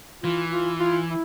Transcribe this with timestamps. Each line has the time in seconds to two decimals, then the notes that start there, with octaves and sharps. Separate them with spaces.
0.23 E3 F4
0.52 F4
0.80 F4
1.08 E4